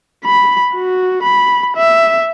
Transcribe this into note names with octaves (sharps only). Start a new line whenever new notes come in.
B5
F#4
B5
E5